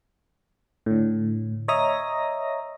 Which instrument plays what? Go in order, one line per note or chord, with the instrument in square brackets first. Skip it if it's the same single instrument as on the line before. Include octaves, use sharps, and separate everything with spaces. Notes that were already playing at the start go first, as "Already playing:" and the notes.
[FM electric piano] A2 D3
C#5 D#5 E5 A#5 D#6 A#6